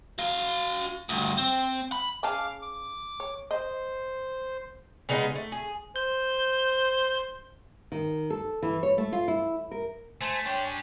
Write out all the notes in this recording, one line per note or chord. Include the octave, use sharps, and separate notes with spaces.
F#4 F5
D2 G2
C4
B5
C#3 G#4 F5 A5 D6
D6
C#5
C5 D#5
C#3 G#3 B3 D#4
A3
G#4
C5 G6
D#3
A4
E3
C#5
A3
F4
E4
A#4
A3 C5 G#5 A5
D4 G4 C#5 G5 C6
G#5